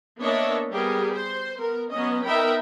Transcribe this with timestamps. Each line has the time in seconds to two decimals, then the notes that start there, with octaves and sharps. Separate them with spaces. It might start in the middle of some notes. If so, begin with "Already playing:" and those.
0.20 A#3 B3 D4 C#5 D#5 E5
0.71 G3 B3 G4 G#4 A#4
1.14 C5 C6
1.58 B3 A#4
1.91 F#3 B3 C#4 D#5
2.25 B3 D#4 A#4 E5 G5 B5